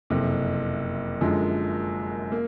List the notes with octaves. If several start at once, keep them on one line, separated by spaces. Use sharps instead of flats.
F#1 F2 C3
F#2 D3 F3 G#3
A#3